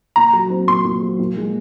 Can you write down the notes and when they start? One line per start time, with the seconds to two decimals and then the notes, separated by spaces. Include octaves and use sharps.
0.16 A#2 A#5
0.33 F#3
0.50 C4
0.68 A#2 C6
0.85 A#2
1.03 F#3
1.19 A#2
1.37 G#3